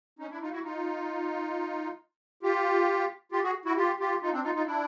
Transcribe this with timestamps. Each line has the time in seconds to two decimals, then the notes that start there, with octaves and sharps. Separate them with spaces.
0.19 C#4 D#4
0.30 D4 E4
0.42 D#4 F4
0.52 E4 F#4
0.64 D#4 F4
2.43 F4 G4
3.32 F4 G4
3.43 F#4 G#4
3.65 E4 F#4
3.76 F4 G4
3.99 F4 G4
4.22 D#4 F4
4.33 C4 D4
4.44 D#4 F4
4.55 D#4 F4
4.66 D4 E4